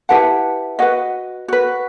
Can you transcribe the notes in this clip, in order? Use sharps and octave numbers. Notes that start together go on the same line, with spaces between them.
E4 G4 B4 F#5 A5
F#4 B4 D#5 F#5
F#4 B4